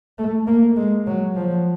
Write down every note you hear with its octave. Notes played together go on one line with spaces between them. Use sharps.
A3
A#3
G#3
F#3
F3